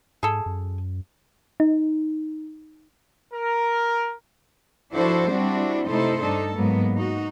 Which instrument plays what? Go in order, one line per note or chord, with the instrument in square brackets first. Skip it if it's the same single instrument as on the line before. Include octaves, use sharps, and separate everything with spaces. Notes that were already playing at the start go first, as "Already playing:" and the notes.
[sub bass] G#2 [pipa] G#4 A4
[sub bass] F#2
[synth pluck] D#4
[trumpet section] A#4
[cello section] F3 D4 E4 F#4 A4 C5
G3 C4 D4 E4 F#4
C3 A3 D#4 E4 A4 C5
G2 D4 D#4 A4
G#2 F#3 A#3 B3
D#4 F#4